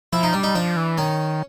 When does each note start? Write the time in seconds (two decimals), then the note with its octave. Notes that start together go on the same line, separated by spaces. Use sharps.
0.13 F3 E4
0.23 D#4
0.33 G3 D4
0.43 D#4
0.55 F3 D4
0.76 E3
0.98 D#3 C#4